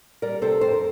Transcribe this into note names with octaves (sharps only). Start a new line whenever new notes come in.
G3 A#4 D5
C3 A4 C5
F2 C5
A#4